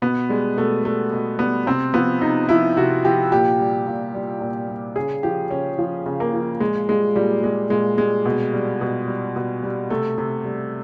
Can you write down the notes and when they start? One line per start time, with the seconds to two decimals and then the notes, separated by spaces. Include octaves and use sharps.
0.02 B2 B3
0.29 G3 G#3
0.57 B2 A3
0.84 G3 A3
1.12 B2
1.39 G3 B3
1.66 C3 C4
1.94 F3 B3
2.21 C3 D#4
2.49 F3 E4
2.77 C3 F#4
3.05 F3 G4
3.32 A#2 G4
3.60 G3
3.87 A#2
4.15 G3
4.41 A#2
4.68 G3
4.96 C#3 G#4
5.23 F3 G4
5.51 C#3 C#4
5.78 F3
6.06 C#3
6.20 A#3
6.33 F3
6.60 A#2 G#3
6.89 G3 G#3
7.15 A#2 G3
7.43 G3 G#3
7.70 A#2 G#3
7.98 G3 G#3
8.25 B2
8.53 G3
8.81 B2
9.07 G3
9.36 B2
9.63 G3
9.90 C3 A3
10.18 C3
10.45 G3